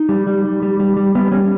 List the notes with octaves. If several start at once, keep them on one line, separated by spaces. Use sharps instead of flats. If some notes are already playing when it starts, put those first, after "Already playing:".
Already playing: D#4
G3
G3
G3
G3
G3
G3
G3 B3
G3 C#4